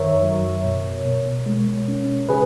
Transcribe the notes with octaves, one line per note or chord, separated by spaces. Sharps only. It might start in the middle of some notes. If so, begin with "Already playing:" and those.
Already playing: F#2 D#3 A#4 C#5 E5
F#3
B2
B2
G#3
C#4
C#3 G#4 B4